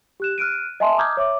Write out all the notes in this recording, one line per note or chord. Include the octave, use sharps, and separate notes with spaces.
G4 F#6 E7
F6 F#6 D7 D#7
D#5 E5 G#5 A5 C6
A#5 D6 D#6 F6 G6 G#6
C#5 E5 D6